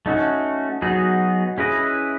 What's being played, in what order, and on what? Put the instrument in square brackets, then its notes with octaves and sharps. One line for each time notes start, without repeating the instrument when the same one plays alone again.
[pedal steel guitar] A3 C#4 F#4 [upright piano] D#4
[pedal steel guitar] F#3 B3 D#4 G#4 [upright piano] F#4
[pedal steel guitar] C#4 E4 B4 D#5 [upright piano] G#4